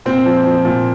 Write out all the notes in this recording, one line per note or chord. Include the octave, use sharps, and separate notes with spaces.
A#2 C4
F3
F3
A#2